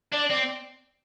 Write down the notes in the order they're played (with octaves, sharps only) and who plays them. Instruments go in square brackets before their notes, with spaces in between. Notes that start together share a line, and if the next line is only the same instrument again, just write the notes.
[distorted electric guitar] D4 [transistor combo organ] D5
[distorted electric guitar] C4 [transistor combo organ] D5